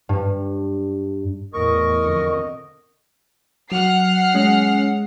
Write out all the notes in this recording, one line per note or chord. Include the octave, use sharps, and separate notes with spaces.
G2
E2 A2 A#4 D#5 C#6
F2 D3
F#3 F#5 F6 C7
G#3 C#4